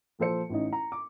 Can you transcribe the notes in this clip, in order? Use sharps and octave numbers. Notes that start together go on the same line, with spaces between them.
A#2 F3 A4 C5 C#7
A1 C#4 D#4
A#5
D6